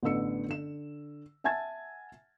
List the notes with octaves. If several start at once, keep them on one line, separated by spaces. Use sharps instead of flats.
A1 D3 B3 E6 C#7
D3 E7
E5 F#5 G#5 A5 G#6 A6